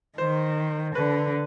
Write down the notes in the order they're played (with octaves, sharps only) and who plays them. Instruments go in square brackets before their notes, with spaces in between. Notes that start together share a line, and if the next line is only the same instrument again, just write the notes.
[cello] D#3 [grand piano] C5
[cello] D3 [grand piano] B4